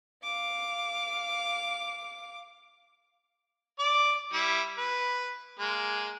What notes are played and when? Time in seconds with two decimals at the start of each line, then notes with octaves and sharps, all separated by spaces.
0.23 F5 D6
3.79 D5 D6
4.33 G3 E4
4.78 B4
5.59 G#3 A#3